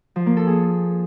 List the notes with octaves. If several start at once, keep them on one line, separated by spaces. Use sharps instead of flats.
F3
A#3
A4
G#4